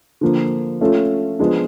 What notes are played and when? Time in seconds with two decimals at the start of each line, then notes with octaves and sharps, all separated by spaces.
0.21 D3 F3 A#3
0.81 A3 C#4 F4 A4
1.39 F3 G#3 B3 D4